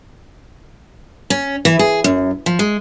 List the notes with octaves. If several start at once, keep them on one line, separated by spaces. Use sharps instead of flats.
C#4
E3
G#4
F#2
F3
G#3